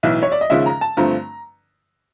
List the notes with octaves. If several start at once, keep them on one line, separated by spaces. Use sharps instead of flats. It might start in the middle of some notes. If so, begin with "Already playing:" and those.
B1 A2 E3 E5
C#5
D5
D#5
D#2 C#3 F3 G#3 C#4 E5
A#5
A5
G2 D3 F3 A3 C4 A#5